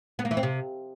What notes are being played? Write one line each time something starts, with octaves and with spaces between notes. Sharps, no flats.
B3
A#3
E3
C4
C3